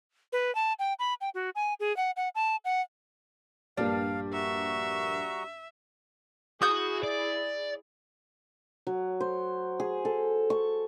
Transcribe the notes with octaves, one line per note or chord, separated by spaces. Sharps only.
B4
A5
G5
B5
G5
F#4
G#5
G#4
F#5
F#5
A5
F#5
A#1 G2 G3 A#3 D4 F5
F#4 E5 A#5 C#6
E4 F#4 G#4 D#6 G6
D5
F#3
C5
G#4
A4
C#6